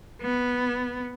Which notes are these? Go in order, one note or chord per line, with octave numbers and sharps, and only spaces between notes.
B3